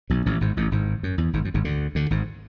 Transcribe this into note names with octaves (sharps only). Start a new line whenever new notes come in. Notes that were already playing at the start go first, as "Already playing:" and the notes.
B1 B2
A1 A2
G#1 G#2
A1 A2
G#1 G#2
F#2
E2
G#1 G#2
F#2
G#1 G#2
D2 D3
D2 D3
G#1 G#2